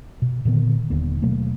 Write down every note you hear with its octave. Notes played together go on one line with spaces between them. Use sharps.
B2
A#2 D3 D#3 B3
D#1 D#2 D3 B3
B2 F#3 A3 A#3